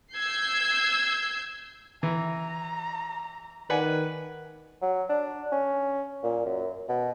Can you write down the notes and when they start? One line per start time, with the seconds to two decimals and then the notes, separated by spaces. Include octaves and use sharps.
0.15 E6 G6 G#6 C7
2.03 E3 A#5
3.70 D#3 B4 D5 F#5 G#5
4.82 F#3
5.09 D4
5.52 C#4
6.23 A#2
6.45 F#2
6.88 B2